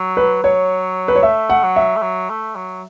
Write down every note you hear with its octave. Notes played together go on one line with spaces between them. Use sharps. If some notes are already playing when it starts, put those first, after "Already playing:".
Already playing: F#3
B4
F#3 C#5
B4
C#5
A3 E5
F#5
F#3
E5
A3
F#3
A3
F#3